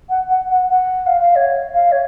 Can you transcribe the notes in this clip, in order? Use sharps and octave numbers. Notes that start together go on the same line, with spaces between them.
F#5
F#5
F#5
F#5
F5
F5
C#5
F5
C#5